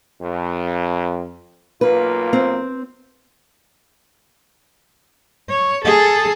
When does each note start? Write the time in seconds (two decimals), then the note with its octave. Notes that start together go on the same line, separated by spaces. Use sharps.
0.21 F2
1.81 B1 A#3 F4 B4
2.33 C4
5.49 C#5
5.85 G#4 A4